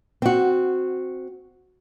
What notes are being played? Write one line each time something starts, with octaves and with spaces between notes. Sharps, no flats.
C4 F#4